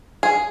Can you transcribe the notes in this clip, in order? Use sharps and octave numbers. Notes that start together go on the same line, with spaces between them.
G#4